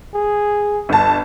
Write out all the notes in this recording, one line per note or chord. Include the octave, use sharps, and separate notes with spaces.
G#4
G1 A5